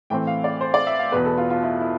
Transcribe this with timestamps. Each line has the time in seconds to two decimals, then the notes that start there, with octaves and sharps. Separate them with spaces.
0.10 A2 E3 A3 C4 G5
0.27 F5
0.44 D5
0.61 C5
0.74 D5
0.87 E5
0.99 F5
1.12 E2 B2 B3 B4
1.25 A4
1.38 F4
1.50 F4
1.63 E4
1.80 E4